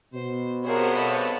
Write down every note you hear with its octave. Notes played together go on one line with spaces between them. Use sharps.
B2 C5
G2 C3 B3 G#4 A#4 C5 C#5
A4 C#5 D#5 B5